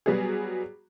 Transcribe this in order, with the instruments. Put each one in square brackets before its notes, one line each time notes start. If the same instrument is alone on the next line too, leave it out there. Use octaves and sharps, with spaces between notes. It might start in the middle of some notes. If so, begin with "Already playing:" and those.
[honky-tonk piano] F#3 G3 B3 F#4 G#4